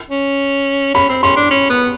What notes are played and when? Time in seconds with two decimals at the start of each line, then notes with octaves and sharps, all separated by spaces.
0.10 C#4
0.94 C#4 B5
1.09 C4
1.23 C#4 C6
1.36 D4
1.51 C#4
1.70 B3